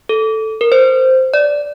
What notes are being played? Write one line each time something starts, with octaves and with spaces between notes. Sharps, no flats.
A4
A#4
C5
D5